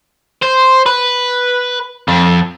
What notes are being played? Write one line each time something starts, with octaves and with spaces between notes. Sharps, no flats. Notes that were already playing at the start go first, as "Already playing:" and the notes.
C5
B4
F2